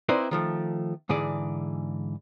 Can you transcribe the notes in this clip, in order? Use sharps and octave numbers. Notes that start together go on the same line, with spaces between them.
C4 D#4 E4 B4 C5 D5
D#3 F3 A3
G#2 D3 E3 G#4 D5